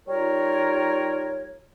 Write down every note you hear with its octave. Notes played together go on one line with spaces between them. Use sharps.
G3 D#4 F4 A#4 C#5